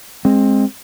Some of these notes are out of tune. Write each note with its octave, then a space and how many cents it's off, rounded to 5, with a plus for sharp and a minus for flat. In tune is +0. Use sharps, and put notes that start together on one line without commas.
G#3 +0 C4 +20